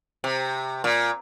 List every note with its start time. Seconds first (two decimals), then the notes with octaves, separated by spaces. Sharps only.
0.24 C3
0.84 A#2